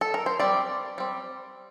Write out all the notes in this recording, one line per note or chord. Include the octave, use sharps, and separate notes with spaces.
A4
A#4
C5
G3 C4 D5
G3 C4